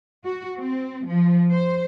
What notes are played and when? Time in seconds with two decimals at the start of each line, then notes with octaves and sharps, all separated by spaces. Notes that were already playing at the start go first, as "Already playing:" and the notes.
0.24 F#4
0.58 C4
1.07 F3
1.50 C5